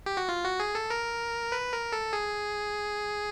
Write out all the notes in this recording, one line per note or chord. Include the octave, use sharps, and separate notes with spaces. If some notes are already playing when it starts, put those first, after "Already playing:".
G4
F#4
F4
F#4
G#4
A4
A#4
B4
A#4
A4
G#4